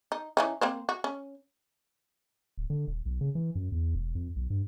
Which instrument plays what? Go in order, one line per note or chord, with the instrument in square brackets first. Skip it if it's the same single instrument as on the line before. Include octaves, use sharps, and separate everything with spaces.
[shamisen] D#4
E3 C#4 D#4
A#3 C4 C5
F#4
C#4
[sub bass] D1
D3
D#1
B1
C#3
E3
F#2
E2
E1
F2
B1
G2